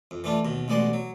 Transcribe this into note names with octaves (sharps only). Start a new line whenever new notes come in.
F2
E3 A3 D4 F4
D#2 B2
A1 B2 G#3 D5 F#5 C6
F#3